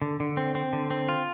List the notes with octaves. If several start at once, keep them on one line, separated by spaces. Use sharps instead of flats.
D3
D3
C4
C4
D3
C4
F4